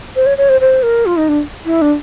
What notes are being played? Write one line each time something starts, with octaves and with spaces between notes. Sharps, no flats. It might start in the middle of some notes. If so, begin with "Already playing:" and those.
C5
C#5
C#5
C5
C5
A#4
F4
D#4
D4
E4
D4